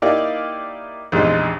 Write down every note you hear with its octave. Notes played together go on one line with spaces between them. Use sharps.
A#3 D#4 E4 G4 D5 F5
A#1 E2 C3 G#3 D#4